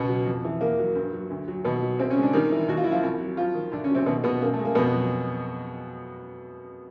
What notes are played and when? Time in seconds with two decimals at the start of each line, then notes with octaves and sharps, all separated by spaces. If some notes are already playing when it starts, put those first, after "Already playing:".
Already playing: C#2 B2 B3
0.09 F#3
0.26 F2
0.44 E3
0.61 E2 A#3
0.79 F#3
0.95 G2
1.13 F#3
1.30 D2
1.48 F#3
1.65 D#2 B2 B3
1.82 F#3
1.99 C2 C4
2.10 C#3 C#4
2.17 G#3
2.23 D3 D4
2.33 D#3 G3 D#4
2.52 E3
2.68 D#2 F#4
2.77 F4
2.84 F#3 E4
2.92 F3 F4
3.03 C2
3.20 F#3
3.37 F3 F#3 F4
3.54 D#3
3.72 D2 D3 D4
3.84 C#3 C#4
3.90 C3 F#3 C4
4.06 D#2 B2 B3
4.24 B2 F3 B3
4.42 F#2 A#3
4.53 A3
4.59 G#3
4.65 A#3
4.75 F2 B2 B3
4.93 F#3